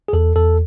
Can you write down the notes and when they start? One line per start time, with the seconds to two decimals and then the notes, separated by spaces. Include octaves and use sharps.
0.08 G#4
0.13 E2 A4
0.36 E2 A4